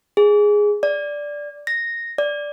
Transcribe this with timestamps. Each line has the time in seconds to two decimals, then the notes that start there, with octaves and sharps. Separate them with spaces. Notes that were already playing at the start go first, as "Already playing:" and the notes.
0.17 G#4
0.83 D5
1.67 A#6
2.18 D5